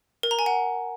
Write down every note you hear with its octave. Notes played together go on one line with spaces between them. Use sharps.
A#4
A#5
G#5
F#5